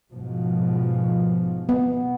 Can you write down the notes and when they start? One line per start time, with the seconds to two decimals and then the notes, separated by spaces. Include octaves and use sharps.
0.12 G#2 B2 F3
1.69 B3